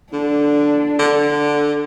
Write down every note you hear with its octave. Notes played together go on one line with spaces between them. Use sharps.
D3 D4
D3